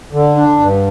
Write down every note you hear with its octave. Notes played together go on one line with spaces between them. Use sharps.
D3
D4
G2